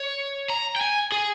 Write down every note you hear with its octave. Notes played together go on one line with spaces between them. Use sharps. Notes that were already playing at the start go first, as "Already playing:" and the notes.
Already playing: C#5
A#5
G5
G#5
G#4